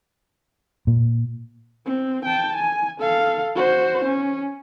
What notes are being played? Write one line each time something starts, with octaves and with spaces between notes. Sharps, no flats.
A#2
C4
G5 A5
G#5
A4 F5
F#4 C5
C#4